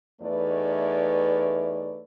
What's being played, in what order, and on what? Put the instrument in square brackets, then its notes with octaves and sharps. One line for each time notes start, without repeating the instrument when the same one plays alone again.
[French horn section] E2 A3 D#4 B4 C#5 D5